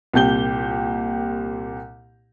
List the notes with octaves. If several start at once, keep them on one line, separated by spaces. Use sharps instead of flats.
C2 A#2 G4 G6 G7